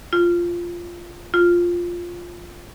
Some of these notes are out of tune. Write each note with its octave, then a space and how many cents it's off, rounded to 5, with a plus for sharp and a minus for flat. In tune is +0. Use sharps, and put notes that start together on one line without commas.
F4 -10
F4 +0